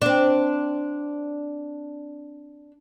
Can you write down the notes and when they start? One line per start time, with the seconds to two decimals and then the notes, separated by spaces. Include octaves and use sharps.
0.02 C4 D4